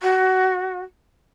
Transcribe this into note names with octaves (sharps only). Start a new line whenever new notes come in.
F#4